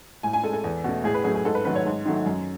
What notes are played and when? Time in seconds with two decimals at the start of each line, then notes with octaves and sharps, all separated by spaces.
0.23 A2 G#5
0.33 G#5
0.43 G#3 A4
0.53 A4
0.64 E2
0.84 B2 A3
1.04 A2 G#4
1.14 B4
1.24 F#3 A3 G#4
1.35 G#4
1.45 G#2 A4
1.55 B4
1.65 D#3 F#3 A3 B4
1.75 C#5
1.85 G#2
2.05 D#3 F#3 A3
2.26 F#2